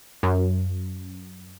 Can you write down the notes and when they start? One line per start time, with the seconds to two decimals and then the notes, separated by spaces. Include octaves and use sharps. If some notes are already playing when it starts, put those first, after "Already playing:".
0.23 F#2